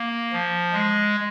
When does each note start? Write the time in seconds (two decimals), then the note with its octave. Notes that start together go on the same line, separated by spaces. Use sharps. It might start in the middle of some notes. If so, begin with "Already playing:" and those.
Already playing: A#3
0.33 F3
0.73 G#3